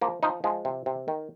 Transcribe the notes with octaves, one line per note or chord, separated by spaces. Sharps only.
F3 A#3
F3 D#4
F3 G#3
C3
C3
D#3